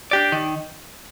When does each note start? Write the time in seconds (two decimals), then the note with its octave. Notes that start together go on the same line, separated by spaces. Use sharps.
0.11 D4 G4 D5
0.32 D#3